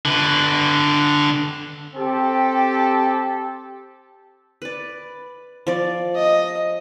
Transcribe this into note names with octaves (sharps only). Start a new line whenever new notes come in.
D3 B4
C4 G4 A4
B4 D5
F3 D5
D#5